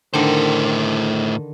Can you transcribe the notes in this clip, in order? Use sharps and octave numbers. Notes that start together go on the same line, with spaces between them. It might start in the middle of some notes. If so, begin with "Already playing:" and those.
A2 D3 D#3 C5